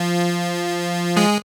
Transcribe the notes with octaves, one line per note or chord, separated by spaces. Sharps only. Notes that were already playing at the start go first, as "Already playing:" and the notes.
Already playing: F3 F4
G#3 G#4